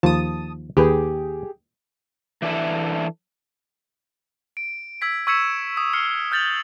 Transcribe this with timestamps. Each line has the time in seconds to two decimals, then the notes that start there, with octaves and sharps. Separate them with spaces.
0.03 D#2 F3 A5 D#6
0.77 D#2 G4 G#4 B4 G5
2.42 E3 D4 A4 E5
4.57 D7
5.01 E6 G#6 B6 D7
5.27 C#6 E6 G#6 B6 C#7 E7
5.77 D#6 B6
5.93 C#6 F6 C7 C#7 G7
6.32 F6 G6 A6 F7 F#7